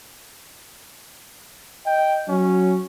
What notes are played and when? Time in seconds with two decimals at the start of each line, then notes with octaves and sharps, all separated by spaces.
1.86 D#5 G5
2.28 F#3 C#4